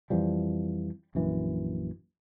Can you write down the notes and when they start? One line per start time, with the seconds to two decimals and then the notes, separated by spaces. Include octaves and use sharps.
0.10 F2 E3 F3 G3
1.15 A#1 F#2 E3